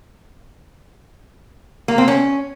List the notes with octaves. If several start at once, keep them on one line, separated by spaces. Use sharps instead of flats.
A#3
C4
C#4